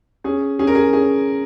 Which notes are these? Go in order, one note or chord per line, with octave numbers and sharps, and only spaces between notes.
C#4 G#4
C#4 G#4
A#4
G#4
C#4 G#4